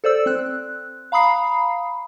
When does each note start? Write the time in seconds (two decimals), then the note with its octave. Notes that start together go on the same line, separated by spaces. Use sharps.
0.04 A4 C5 D5 E6
0.26 C4 F#6
1.12 F5 A#5 B5 D#6 C7